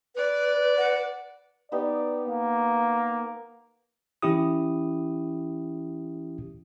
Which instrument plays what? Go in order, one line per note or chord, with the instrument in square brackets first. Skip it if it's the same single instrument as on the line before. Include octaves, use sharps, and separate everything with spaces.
[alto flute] B4 [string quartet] D5
[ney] F#5
[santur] B3 D#4 G4 [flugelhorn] D5
[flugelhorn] A#3
[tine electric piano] E3 C#4 E4 G4 D#6